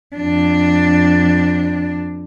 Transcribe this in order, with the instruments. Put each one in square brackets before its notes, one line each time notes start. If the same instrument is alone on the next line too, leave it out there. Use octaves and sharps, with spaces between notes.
[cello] F2 D4